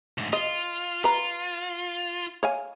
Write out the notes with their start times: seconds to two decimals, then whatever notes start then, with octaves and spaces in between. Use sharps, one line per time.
0.18 D2 G#2
0.33 F4 D#5
1.04 F4 B4 A#5
2.43 C#5 F5 G#5